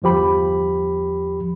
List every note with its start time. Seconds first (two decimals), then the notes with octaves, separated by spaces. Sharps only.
0.02 G1 E2 F3 G4 B5